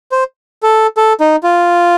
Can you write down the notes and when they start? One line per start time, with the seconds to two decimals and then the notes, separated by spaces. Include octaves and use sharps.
0.12 C5
0.63 A4
0.97 A4
1.20 D#4
1.43 F4